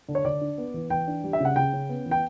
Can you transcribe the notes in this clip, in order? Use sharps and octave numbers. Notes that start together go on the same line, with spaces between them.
D3
C#5
D3 D5
D4
B3
E3
E3 G5
D4
G3
E5
C#3 F#5
C#3 G5
C#4
B3
E3
G5